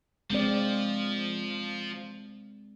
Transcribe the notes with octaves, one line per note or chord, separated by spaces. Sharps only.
F3 G#3 C4 D5